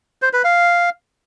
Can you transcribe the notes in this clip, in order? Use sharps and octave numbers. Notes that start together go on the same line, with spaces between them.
C5
B4
F5